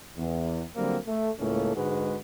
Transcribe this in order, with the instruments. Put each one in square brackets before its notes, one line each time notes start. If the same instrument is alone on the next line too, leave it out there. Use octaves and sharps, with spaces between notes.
[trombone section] E2
D3 F#3 G3 A#3 C4
A3
C#2 A2 A#3 C#4 A4
G#2 D3 G#3 F#4 B4